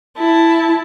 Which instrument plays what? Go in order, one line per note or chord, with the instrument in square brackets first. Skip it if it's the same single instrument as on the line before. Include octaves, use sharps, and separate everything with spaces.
[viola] E4 A5